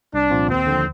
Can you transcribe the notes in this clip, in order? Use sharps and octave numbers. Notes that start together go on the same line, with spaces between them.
C2 D4
A#2 F3 C4 F4
D#2 C4
D3 F3